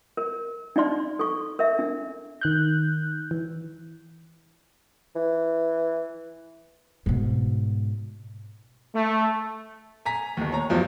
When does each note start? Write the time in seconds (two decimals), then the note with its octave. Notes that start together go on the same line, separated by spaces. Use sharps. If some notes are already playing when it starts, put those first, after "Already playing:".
0.17 A#4
0.76 D4 D#4 D5 C6
1.19 A4 C#6
1.59 A#4 E5
1.79 D4
2.41 D#3 F#6 G6
3.31 E3
5.15 E3
7.06 G#2 B2
8.95 A3
10.06 G#5 A#5 B6
10.37 G1 D#2
10.52 C#5 A#5
10.70 E2 G2 F3 F#3